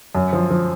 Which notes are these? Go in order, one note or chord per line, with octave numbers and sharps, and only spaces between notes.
F#2
F3
F3